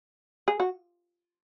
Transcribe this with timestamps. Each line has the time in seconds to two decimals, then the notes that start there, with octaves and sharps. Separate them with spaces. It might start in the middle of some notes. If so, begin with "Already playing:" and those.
0.48 G#4
0.60 F#4